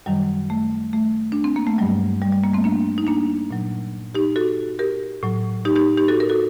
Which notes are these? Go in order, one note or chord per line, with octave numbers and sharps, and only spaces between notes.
F#2 D#3 F#3 G3
A3
A3
D4
C4
A#3
A3
G2 F#3 G3
G3
G3
G3 A#3
A3 C4
A#3 D4
D#4
A#3 D4
A#2 F#3
D#4 G4
F#4 A4
G4 A#4
A2 F#3
D#4 G4
D#4 G4
D#4 G4
F#4 A4
A#4
F#4 A4